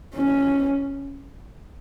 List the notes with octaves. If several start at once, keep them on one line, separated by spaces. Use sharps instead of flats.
C#4